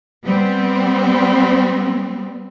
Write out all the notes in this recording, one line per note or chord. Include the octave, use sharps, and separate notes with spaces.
G3 B3 C4